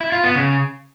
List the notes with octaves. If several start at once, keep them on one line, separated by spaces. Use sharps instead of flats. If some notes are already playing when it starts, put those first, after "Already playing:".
E4
F4
B3
C#3